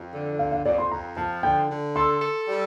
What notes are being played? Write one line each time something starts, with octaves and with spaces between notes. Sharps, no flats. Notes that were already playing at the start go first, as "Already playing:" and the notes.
Already playing: F2
D3
F2 F5
F5
F2 D5
C6
F2 A#5
F3 A5
D3 G5
D3
A4 C6
A4
G3